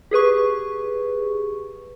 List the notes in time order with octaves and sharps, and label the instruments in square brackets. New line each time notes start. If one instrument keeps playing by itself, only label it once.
[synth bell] G4 G#4 B4 C#6